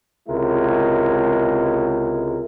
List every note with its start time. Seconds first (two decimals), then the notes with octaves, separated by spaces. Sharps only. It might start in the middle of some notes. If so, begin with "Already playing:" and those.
0.29 C#2 C3 G#3 E4 A#4